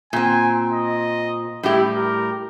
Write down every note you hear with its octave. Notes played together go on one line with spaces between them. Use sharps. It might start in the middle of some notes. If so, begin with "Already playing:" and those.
A#2 C4 G#5
D#5
A2 G3 E4 G4
A#4